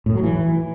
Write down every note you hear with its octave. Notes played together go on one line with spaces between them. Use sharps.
A2
F#3
E3